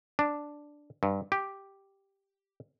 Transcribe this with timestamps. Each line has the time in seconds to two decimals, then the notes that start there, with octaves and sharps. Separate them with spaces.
0.19 D4
1.03 G2
1.32 G4